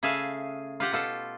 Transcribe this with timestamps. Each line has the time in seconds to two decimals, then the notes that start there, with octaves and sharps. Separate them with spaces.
0.03 C#3 A3 G#4 E5 F5
0.80 F4 G4 F#5
0.92 B2 F4 A4